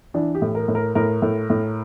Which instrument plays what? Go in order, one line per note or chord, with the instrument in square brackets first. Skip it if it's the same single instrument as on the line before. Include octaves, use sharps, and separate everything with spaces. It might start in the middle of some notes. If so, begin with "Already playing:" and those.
[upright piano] E3 D4
G4
A2
A#4
A2
A#4
A2 A#4
A2
A2